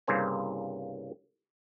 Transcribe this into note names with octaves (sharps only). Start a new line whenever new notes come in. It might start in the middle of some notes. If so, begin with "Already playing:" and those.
C2 G2 C#3 A#3 C5 G#5